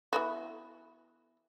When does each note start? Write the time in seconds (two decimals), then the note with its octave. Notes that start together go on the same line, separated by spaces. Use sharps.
0.13 E3 B3 F#4